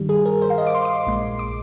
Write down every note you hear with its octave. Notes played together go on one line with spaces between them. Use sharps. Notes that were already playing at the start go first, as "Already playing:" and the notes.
Already playing: G2 D#3 G3
G#4
A#4
C5
F5
D#5
D6
C6
D6
C6
A#1 A#2 G#3
D6